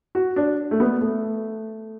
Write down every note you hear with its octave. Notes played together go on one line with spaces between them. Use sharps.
F#4
D4
A3
B3
A3